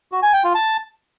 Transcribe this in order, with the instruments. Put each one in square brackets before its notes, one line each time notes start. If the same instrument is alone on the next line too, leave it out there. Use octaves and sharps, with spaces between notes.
[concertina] F#4
G#5
G5
F4
A5